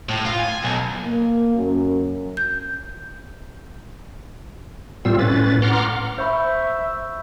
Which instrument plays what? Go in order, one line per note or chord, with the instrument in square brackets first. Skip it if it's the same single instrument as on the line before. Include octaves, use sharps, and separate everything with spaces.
[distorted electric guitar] A2
F4
G#5
B1
[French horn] A#3
F#2
[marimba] G6
[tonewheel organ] A2 G3 C4 F4 E6
A2 C#4 B4 A6
F#5 A#5 C6 D6 F6
[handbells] C5 [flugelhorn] E5 [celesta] B5 C#6 G6